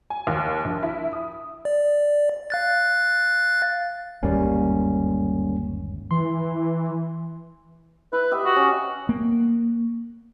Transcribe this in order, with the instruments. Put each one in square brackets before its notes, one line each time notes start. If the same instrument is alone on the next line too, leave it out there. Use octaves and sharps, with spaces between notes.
[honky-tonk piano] G#5
D#2
A#1
E4
D#6
[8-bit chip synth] D5
F5 F#6 A6
[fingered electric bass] G1 D#2 G#2 [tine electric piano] G3 A#3 C#4
[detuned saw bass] E3 [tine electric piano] C6
[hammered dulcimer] E4 [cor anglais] B4
[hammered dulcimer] G4 D#5 E5
[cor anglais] F#4
[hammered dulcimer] C#4
[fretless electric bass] A#3